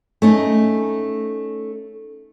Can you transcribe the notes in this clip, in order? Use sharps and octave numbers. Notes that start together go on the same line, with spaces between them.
A3 C#4 D#4